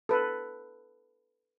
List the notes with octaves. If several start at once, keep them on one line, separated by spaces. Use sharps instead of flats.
A4 B4